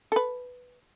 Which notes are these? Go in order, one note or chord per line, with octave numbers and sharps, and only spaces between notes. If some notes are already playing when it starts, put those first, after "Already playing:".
A4 B4